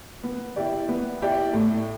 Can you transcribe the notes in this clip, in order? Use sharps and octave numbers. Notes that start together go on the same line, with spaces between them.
B3
E4 G4 D5
B3
E4 G4 D5
A2